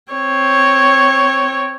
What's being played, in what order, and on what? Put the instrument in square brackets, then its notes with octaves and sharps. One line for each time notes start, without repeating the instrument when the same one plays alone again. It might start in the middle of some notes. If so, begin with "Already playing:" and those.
[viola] C4 C#5